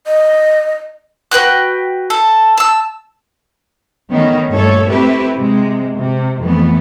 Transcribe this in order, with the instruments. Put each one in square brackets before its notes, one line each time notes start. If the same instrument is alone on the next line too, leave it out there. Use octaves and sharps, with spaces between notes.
[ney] D#5
[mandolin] F#4 B4 G5 F#6
A4
A5 E6
[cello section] D#3 A3 B3 C#4 D#4
G2 A#2 A3 A4 C#5
A3 C4 E4 G4 B4
C3 G#3
C3
F2 E3 A3 B3